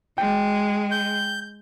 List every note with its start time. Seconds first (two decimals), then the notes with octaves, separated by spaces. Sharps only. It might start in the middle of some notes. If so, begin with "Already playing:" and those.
0.18 G#3 G5
0.91 G6